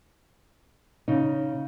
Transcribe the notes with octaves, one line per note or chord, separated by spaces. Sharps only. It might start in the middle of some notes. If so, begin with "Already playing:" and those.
C#3 D#4